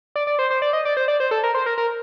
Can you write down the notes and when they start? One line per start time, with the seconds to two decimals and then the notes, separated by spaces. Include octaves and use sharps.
0.16 D5
0.27 D5
0.39 C5
0.50 C5
0.62 D5
0.73 D#5
0.85 D5
0.97 C5
1.08 D5
1.20 C5
1.31 A4
1.43 A#4
1.55 C5
1.66 A#4
1.78 A#4